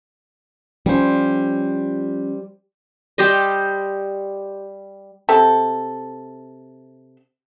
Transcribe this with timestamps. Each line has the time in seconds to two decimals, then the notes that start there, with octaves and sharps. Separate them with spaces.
0.86 F3 G3 C#4 C5
3.18 G3 G4 C5 D#5
5.29 C3 A4